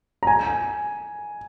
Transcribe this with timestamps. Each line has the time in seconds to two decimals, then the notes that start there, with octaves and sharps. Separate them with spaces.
0.23 A#5
0.27 G#5